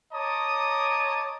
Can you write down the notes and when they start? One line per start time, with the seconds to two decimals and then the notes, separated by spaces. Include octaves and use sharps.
0.13 C#5 D#5 A5 A#5 D6 D#6